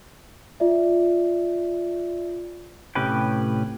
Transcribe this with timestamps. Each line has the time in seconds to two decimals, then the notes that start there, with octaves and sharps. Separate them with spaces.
0.60 F4 D5 E5
2.95 A2 C3 C#4 G4 B4 G5